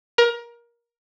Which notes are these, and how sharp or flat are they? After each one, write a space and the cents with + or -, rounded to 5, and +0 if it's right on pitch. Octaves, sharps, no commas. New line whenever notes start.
A#4 +20